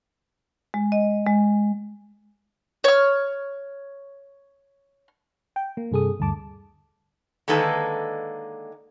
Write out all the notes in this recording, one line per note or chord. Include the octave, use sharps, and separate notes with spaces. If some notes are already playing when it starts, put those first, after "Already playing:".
G#3
D#5
G#3
C#5 F6
G5
A#3
G2 C3 G#4 A4 D#6
D2 G2 A5 D6
D3 D#3 G#3 A#3 A4 B4